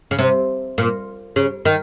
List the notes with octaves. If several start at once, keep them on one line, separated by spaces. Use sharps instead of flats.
C#3
C3
A#2
C#3
D#3